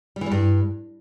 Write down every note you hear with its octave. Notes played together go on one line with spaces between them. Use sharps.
G3
E3
G3
G2